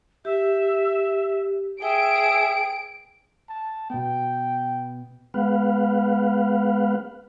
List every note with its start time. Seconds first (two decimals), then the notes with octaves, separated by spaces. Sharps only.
0.25 G4 E5
1.82 G#4 E5 G5 D7
3.49 A5
3.90 B2 B3 G5
5.34 G#3 B3 B4 F5 F#5